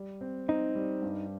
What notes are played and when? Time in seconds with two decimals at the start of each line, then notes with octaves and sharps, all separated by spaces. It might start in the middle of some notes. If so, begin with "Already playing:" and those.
Already playing: G3
0.21 C4
0.48 C4 D#4
0.75 G3
1.02 G2